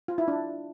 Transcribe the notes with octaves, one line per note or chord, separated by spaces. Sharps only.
F4
E4
D4